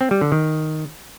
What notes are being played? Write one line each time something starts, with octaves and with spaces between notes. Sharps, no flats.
C4
G3
D3
D#3